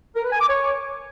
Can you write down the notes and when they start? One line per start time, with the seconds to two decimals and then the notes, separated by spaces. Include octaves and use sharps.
0.16 A#4
0.24 B4
0.32 G#5
0.41 D6
0.49 C#5